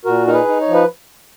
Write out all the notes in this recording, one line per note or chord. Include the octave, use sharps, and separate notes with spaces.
A#2 F#4 A#4
D#4 A#4
G#4 B4
D#4
C#5
F3
B4